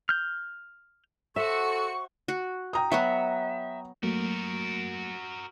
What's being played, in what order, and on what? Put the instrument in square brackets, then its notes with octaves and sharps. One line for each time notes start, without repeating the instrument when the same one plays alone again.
[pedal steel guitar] F6 G6
[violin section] F#4 C#7 [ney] A4 [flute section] C5 F#5 C#6 [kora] E5
[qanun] F#4
[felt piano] G5 A#5 D#6
[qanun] F#3 B3 F#4 [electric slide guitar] E5
[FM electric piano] F#3 A3 A#3 [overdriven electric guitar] F#4 A#4